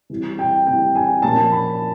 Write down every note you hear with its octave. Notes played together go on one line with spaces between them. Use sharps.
E3 G3 C4
G5
E3 G3 C4 G5
G#5
A#2 F3 A#3 C#4 A5
B5